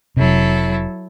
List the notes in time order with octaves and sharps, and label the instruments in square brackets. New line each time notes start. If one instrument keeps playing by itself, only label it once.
[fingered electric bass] F1 C3 [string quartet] F#3 E4 A4